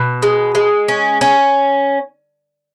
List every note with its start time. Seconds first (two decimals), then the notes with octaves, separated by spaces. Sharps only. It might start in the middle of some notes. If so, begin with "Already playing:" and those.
Already playing: B2
0.22 G#3
0.55 G#3
0.88 C#4
1.21 C#4